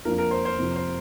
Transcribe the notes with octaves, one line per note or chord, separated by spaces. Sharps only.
F2 F3 A#3 D4 F4 A#4
A#4
C5
C5
F2 C3 F3
C5